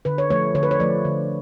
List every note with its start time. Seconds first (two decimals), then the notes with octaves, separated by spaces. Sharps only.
0.05 D3 B4
0.18 C#5
0.30 F3 A3 C#5
0.55 D3 C#5
0.63 B4
0.71 C#5
0.80 F3 A3 D5
1.05 D3